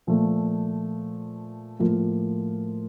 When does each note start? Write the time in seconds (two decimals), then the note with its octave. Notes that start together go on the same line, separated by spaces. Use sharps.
0.07 A#2 F3 A3
1.79 A2 F3 A#3 F4